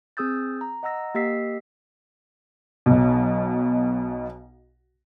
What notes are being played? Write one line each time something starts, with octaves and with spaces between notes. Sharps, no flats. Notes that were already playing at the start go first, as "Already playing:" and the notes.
C4 G#4 D#6 E6 G6 A6
A#5
D#5 F#5 A#5 E6 A#6
A#3 G4 D#5 E6 B6 C7
B1 B2